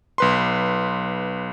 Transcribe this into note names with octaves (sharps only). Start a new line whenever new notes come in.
B1 B4 C6